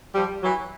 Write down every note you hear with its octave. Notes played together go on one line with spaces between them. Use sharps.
F3 G3
E3 F#3